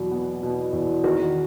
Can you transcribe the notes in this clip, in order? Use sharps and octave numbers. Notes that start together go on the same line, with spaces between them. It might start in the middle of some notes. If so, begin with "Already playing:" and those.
Already playing: E2 B2 F#3 F#4
B3
B2
E2
D#3 F#4